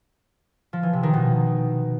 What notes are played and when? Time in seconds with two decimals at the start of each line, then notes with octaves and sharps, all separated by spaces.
0.73 F3
0.83 E3
0.93 C3
1.03 D#3
1.13 B2